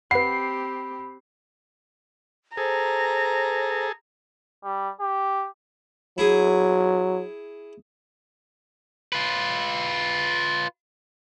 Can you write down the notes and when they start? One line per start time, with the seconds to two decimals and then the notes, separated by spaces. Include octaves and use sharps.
0.11 C4 G4 B4 F#5 B5 C7
2.57 G#4 A4 C5 A#5
4.64 G3
5.00 G4
6.18 F#3 E4 G#4
9.13 F4 B4